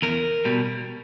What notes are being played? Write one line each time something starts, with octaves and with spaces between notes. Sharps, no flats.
E2 A#4
B2 G3